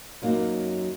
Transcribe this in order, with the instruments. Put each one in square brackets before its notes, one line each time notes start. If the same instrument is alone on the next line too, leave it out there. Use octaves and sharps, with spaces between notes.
[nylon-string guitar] F#2 F#3 A#3 D#4 F5